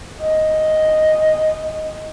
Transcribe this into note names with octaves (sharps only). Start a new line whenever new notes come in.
D#5